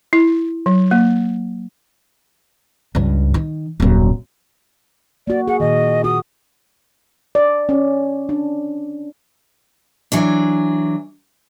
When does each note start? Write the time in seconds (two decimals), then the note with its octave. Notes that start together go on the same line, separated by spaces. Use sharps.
0.13 E4
0.66 F#3
0.91 A#3
2.95 C#2 G2
3.34 D#3
3.80 D#1 F#2
5.27 A#3 F#4 D5
5.48 G#4 F#5
5.60 A#2 D#3 D#5
6.04 F#4 D#6
7.35 D5
7.69 C#4
8.29 D4
10.12 E3 F#3 D4